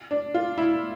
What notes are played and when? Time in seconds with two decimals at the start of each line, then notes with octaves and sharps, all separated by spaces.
0.11 D4
0.34 F4
0.58 E4